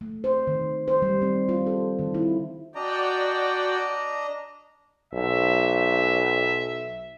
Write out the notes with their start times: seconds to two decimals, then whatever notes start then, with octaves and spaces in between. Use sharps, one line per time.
0.01 A3
0.24 C5
0.47 D#3
0.88 C5
1.02 G3
1.22 C4
1.49 F4
1.67 A4
1.99 D#3
2.14 E4
2.75 D4 F#4 D5 D#5 G5 A#5
5.13 B1 E5